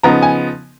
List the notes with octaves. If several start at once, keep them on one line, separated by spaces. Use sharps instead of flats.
C#3 F3 B3 D#4 A#5
G#5